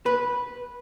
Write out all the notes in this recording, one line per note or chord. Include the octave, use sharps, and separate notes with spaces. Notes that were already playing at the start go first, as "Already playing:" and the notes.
B4